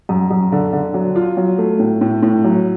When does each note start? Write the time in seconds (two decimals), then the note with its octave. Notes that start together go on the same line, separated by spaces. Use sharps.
0.09 F#2
0.31 F#2
0.52 D3
0.73 D3
0.94 F#3
1.16 F4
1.37 F#3
1.59 A3
1.79 A2
2.01 A2
2.23 A2
2.44 F#3